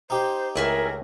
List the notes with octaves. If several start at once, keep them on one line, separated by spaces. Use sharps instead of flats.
D#4 G4 C5
C#2 A3 C4 E4 G#4 A#4 E5